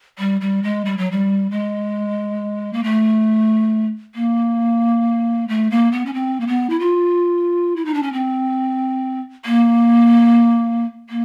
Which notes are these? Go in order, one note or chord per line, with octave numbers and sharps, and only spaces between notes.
G3
G3
G#3
G3
F#3
G3
G#3
A#3
A3
A#3
A3
A#3
B3
C#4
C4
A#3
B3
E4
F4
E4
D#4
D4
C#4
C4
A#3
A#3